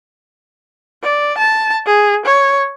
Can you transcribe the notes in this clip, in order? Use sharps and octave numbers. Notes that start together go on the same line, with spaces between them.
D5
A5
G#4
C#5